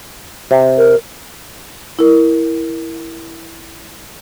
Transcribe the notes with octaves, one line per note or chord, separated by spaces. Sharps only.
C3
A#4
E4 A#4